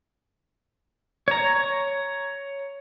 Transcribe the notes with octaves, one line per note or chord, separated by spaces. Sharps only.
C#5 A#5